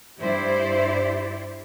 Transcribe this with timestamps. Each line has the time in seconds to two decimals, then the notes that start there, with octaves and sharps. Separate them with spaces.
0.19 G2 E4 G4 C5 D5